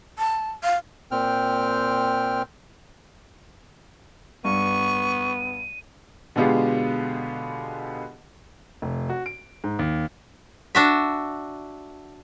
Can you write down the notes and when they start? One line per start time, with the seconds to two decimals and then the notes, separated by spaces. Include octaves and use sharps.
0.19 A5
0.64 F5
1.11 A#2 C4 G5 F6
4.45 G2 B3 C#6 D#7
6.36 B2 D3 G#3 B3 F4 G4
8.82 F1
9.10 F#4
9.26 D7
9.64 G#2
9.79 D#2
10.75 D4 F#4 E5